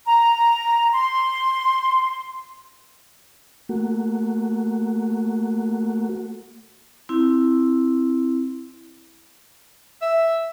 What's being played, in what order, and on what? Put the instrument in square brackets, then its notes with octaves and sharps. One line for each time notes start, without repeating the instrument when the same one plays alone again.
[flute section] A#5
C6
[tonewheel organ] A3 A#3 F#4
[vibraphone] C4 E4
[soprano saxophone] E5